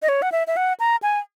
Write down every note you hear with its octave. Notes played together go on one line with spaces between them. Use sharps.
D#5
C#5
F#5
E5
E5
F#5
A#5
G#5